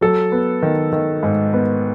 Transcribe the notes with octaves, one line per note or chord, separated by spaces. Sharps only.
F#3 A4
B3
D#3
D#3
G#2
B3